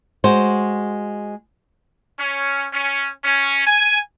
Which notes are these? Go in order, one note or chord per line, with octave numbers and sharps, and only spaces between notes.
G#3 F#4 C5
C#4
C#4
C#4
G#5